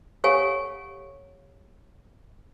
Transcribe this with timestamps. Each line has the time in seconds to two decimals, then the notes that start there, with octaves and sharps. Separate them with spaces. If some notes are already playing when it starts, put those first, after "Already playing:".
0.24 G4 A4 C#5 F5 F#5 G#5